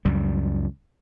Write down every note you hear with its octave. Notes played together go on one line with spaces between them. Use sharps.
C#2 F#2 G3